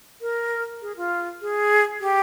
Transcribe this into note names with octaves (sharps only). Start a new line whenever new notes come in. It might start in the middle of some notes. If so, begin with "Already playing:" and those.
A#4
G#4
F4
G#4
G4